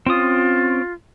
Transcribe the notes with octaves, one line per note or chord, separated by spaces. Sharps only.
C4 C#4 F4 D#6